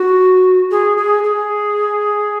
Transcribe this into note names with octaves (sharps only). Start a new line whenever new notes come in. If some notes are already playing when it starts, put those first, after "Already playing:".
Already playing: F#4
G#4
G#4
G#4